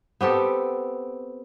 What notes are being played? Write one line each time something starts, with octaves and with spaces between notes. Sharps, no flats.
B3 C4 G4 A4